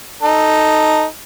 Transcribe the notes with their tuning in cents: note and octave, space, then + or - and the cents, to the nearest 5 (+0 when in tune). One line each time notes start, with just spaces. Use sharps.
D#4 +0 A4 +0